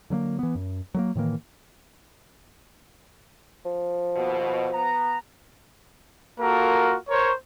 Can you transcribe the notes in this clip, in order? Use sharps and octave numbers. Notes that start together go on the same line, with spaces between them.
D3 F#3 A3 A#3
E3 B3
F#2
F#3 A3 A#3
A2 D#3 E3 A#3
F3
D#2 B2
B3 A#5
A#3 F4 F#4 A4 A#4
A#4 C5 C#5